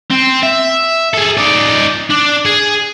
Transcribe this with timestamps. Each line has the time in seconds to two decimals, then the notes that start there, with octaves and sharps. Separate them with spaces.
0.11 C4
0.43 E5
1.14 G#4 A4
1.38 D#4 D5
2.11 D4
2.46 G#4